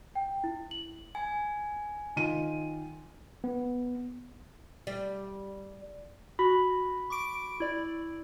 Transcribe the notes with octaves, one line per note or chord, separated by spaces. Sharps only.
G5
E4
F#7
G#5
D#3 F4 D#7
B3
G3
F#4 B5
C#6 D6 D7
E4 D5